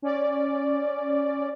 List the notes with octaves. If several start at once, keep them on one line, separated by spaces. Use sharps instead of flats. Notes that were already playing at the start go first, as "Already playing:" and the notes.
C#4 D5